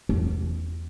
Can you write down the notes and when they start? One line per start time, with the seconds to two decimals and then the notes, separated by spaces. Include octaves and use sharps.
0.09 E2